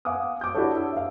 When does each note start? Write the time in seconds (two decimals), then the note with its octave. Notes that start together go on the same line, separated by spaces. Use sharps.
0.05 F5 F#5 G#5 D6 D#6
0.41 D6 G6
0.54 D4 E4 F#4 G4 A4 C#5
0.76 E6
0.93 E5 F5